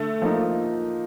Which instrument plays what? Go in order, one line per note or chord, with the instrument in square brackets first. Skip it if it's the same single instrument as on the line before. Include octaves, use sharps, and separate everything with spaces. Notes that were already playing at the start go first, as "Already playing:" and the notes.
Already playing: [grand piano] D3 [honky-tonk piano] A3
[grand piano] F3 A#3 D#4